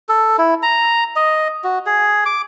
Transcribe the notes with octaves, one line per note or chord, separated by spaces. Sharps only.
A4
E4
A#5
D#5
F#4
G#4
D6